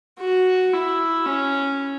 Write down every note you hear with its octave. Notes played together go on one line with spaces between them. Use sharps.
F#4
E4
C#4